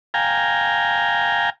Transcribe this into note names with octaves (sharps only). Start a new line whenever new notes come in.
F5 G5 G#5 A#5